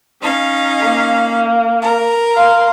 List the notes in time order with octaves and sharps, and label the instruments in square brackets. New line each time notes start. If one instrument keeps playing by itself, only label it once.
[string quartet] C#4 D#4 F5
[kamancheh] A#3
[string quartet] A#4
[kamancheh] F5 C6